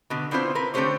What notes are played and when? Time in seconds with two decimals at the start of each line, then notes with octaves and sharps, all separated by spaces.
0.10 B2 D3
0.31 B3 C4 D4 E4 F4 C5
0.55 A#4 B4
0.74 D3 A3 C4 G4 C5 C#5